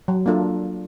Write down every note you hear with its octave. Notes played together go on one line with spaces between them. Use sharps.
F#3
A#3 D4 F4 A4